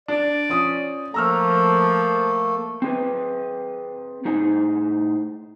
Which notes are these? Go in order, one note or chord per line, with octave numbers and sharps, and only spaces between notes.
D4 D5
F3 C#4 D#6
F3 A3 A#3 A4 A#5 E6 F6
C4 G#4 B4
A2 D#4 G#4 C5 G#5